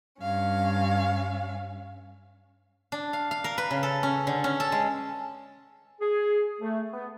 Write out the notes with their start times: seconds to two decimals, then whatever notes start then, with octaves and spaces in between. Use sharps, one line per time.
0.21 G2 C#4 F5
2.92 D4
3.13 F5
3.31 F5
3.44 A#4
3.58 B4
3.71 C#3
3.83 A4
4.03 C#4
4.27 D3
4.44 C#4
4.60 A4
4.72 G#3
6.00 G#4
6.60 A3
6.92 B3